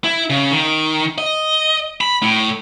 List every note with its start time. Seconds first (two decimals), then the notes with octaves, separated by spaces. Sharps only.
0.04 E4
0.30 C#3
0.51 D#3
1.18 D#5
2.01 B5
2.22 A2